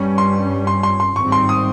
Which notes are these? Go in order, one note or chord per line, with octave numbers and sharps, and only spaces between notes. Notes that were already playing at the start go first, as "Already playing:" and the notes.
Already playing: G2 G3 C#4
C6
C6
C6
C6
G#1 G#2 G3 C4 C#6
C6
D#6